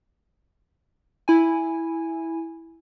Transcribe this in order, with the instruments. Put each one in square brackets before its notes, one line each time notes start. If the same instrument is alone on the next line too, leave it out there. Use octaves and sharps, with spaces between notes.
[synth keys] E4 G#5